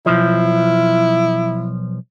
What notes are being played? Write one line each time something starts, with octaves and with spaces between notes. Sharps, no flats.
B1 F3 E4